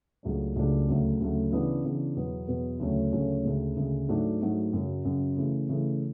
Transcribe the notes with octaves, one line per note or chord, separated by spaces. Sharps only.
C#2 C#3 F#3 A3 D4
C#2 C#3 F#3 A3 D4
D2 C#3 F#3 A3
D2 C#3 F#3 A3
C#3 E3 B3 D4
C#3 E3 B3 D4
E2 B2 F#3 B3
E2 B2 F#3 B3
D2 C#3 F#3 A3 C#4
D2 C#3 F#3 A3 C#4
D2 C#3 G#3
D2 C#3 G#3
G#2 F#3 A3 D4 F#4
G#2 F#3 A3 D4 F#4
F#2 C#3 F#3
F#2 C#3 F#3
C#3 E3 A3
C#3 E3 A3